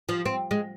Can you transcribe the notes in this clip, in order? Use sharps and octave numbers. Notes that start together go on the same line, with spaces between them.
F3
C4
G#3